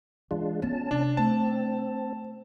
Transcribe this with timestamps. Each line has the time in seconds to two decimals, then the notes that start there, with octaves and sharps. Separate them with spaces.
0.31 E3 G#3 D4 F4
0.62 B3 C#4 A5
0.91 C3 D4
1.17 A3 C4 A5